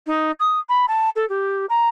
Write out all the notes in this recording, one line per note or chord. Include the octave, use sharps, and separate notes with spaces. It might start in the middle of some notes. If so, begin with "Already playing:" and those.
D#4
D#6
B5
A5
A4
G4
A#5